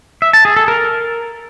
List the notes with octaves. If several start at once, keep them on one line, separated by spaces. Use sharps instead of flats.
E5
A5
G#4
A4
A#4